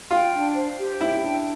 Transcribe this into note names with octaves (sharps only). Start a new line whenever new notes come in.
F4 G5
D4
C5
G4
E4 G5
D4